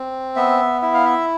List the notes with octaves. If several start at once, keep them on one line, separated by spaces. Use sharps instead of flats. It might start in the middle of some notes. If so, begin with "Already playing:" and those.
Already playing: C4
B3 E5
E4 E5
F5
E5